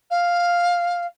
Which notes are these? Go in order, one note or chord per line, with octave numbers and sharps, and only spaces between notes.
F5